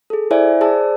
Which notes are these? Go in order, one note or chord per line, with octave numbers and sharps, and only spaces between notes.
G#4 A4
E4 C5 D5 E5 G#5
G#4 C5 D5 A5 E6